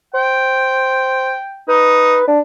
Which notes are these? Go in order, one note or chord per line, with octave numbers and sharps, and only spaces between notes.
C5 G5
D#4 B4
D4